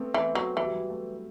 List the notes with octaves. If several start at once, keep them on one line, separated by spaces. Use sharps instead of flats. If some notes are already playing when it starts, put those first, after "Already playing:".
Already playing: A3 B3 C4
E3 B3
F#3 A3
E3 F#3
G3
F#3
A3